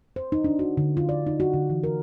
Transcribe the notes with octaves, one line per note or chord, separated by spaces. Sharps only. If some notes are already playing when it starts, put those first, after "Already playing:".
C5
D#4
D4
F#4
D3
F4
D5
D#4
F#4
D3
E3
A#4